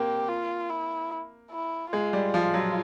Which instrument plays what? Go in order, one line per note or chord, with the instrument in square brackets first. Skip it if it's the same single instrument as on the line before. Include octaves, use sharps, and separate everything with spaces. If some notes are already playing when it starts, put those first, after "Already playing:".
Already playing: [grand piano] A#3 C4 [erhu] G4
[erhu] F4
E4
E4
[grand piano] G#3 [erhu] F4
[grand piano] G3
F3
F#3